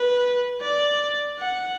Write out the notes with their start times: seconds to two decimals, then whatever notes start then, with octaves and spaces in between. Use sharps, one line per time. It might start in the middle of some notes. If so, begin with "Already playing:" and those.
Already playing: B4
0.61 D5
1.39 F#5